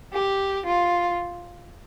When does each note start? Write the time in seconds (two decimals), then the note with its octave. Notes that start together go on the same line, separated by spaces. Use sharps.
0.13 G4
0.65 F4